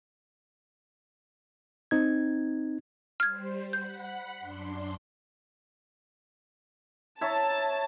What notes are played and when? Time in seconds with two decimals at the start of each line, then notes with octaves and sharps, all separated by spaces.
1.91 C4 D#4 G#6
3.20 G3 C5 F6 G#6
3.73 F#5 B5 G6
4.39 F#2 D4 C6
7.21 C#5 E5 A5 A#5